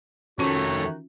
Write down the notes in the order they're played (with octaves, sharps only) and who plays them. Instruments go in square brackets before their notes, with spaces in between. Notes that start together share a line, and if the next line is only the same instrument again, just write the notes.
[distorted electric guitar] F2 A3 [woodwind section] D#3 D#4 F#4 [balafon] C#4 F4 [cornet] C#5